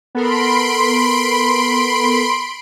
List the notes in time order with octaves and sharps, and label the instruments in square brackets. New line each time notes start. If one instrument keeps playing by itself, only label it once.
[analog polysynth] B3 A4 A#4 [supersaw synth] B5 C6 D7